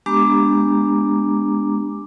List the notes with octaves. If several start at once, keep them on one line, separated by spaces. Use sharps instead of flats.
G#3 B3 D4 G4 A#5 D6